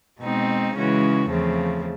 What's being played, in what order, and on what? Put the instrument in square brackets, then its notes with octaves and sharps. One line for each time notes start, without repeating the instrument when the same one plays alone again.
[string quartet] B2 G#3 C4 D#4
C#3 E3 G#3 C#4 F#4
E2 C#3 F3 A3 C4